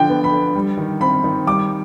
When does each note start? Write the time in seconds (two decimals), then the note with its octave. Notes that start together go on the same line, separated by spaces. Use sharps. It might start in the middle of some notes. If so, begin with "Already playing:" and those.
Already playing: D3 F3 G5
0.09 B3
0.24 B5
0.32 D3
0.55 G3
0.77 D#3
1.01 C4 B5
1.24 D#3
1.47 G3 D6